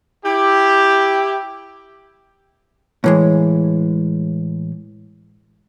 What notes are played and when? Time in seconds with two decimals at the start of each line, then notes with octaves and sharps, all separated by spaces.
0.25 E4 G4
3.04 A2 E3 G#3